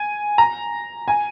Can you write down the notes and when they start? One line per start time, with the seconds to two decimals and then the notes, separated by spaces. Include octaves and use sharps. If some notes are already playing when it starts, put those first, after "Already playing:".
Already playing: G#5
0.38 A#5
1.08 G#5